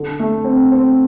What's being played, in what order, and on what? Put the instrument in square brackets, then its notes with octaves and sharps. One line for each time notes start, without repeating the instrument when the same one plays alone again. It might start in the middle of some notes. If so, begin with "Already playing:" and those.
Already playing: [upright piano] D3
A3
C4
C4